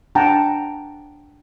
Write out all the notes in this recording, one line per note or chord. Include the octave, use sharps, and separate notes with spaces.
D4 F#5 G5 A5 A#5